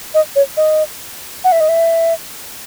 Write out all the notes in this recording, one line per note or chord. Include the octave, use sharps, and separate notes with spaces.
D#5
C#5
D#5
F#5
E5
D#5
E5